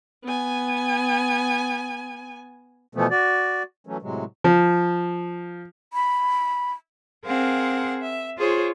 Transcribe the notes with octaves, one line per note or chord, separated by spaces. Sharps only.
B3 G#5
B2 E3 F3 A3 B3
F#4 D5
E3 F#3 A3 C#4
A2 C3 F#3 G#3
F3
B5
C4 G#4 A#4 F5 F#5
E5
F4 G#4 C5 C#5